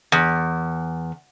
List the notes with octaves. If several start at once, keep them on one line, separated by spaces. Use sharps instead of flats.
E2